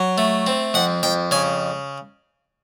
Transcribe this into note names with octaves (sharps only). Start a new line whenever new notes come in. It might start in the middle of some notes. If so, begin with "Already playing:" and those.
Already playing: F#3
A3
C4
F2 F#5
F2 G5
C#3 G#5